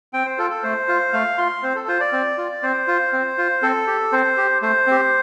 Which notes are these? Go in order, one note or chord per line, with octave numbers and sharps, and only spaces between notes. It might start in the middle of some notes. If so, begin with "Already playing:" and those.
C4 G5
C5
F4 A4
A4
A3 C5
F4
A3 F5
F4 C6
C4 C5
A4
F4 C5
D5
C4
F4
C4 C5
F4
C4
F4
C4 A4
G4
C4 C5
G4
A3 C5
C4 G4